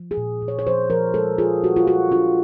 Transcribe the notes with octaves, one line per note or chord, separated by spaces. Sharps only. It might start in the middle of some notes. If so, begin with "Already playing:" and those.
Already playing: F3
G#4
A#2
A#2
C#5
C#5
F3 C5
F3 A#4
G#3 A4
F4 G#4
G3 F#4
F4
F4 F#4
D4 F4